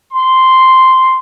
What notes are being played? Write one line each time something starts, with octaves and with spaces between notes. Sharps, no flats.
C6